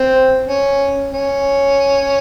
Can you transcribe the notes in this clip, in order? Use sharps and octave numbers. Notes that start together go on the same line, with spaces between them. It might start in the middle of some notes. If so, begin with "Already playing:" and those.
Already playing: C4
C#4
C#4